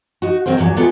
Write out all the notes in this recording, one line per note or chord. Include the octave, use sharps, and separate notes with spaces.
D#4 F#4
D#3 F#3 C4 A#4 C5
E2 G2 A#2 F#3
E2 G3 G#3 B3 F4 A4